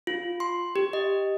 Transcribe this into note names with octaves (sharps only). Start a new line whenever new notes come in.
F4
C6
G4
D#5